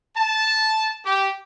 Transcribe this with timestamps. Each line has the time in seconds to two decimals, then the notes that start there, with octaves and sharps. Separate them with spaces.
0.17 A5
1.05 G4